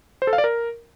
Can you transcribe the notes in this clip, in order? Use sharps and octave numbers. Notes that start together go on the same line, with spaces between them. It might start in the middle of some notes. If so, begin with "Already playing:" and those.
C5
A4
F5
D5
A#4